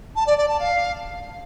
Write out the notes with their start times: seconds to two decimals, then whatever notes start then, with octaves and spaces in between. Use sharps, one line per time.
0.15 A5
0.26 D5
0.37 D5
0.48 A5
0.59 F5